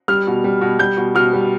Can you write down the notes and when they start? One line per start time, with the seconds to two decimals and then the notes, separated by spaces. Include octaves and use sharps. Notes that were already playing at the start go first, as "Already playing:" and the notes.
0.08 G3 F6
0.27 B2
0.44 G3
0.61 B2
0.79 G3 G6
0.97 B2
1.15 B2 F6
1.33 G3